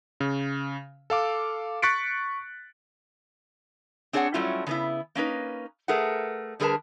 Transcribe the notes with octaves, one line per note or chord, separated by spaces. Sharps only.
C#3
A4 F5 D6
C#6 F#6 A6 B6 C#7 D7
C4 D4 G#4 C#5 D5 F#5
F#3 G3 A3 C#4 E4 F4
C#3 B3 E4
A#3 C#4 D#4 B4
A3 G#4 A#4 B4 F#5
D3 G3 G#4 A#4 B4 A5